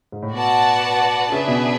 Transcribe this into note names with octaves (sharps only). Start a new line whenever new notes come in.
G#2
A2
B2 F#4 B4 D5 F#5 A5
C#3 D4 G#4 B4 E5
B2